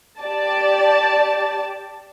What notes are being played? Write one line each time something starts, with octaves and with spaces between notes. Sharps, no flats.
G4 D5 A5